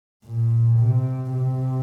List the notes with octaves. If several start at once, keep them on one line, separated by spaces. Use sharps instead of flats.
A#2
C3
C3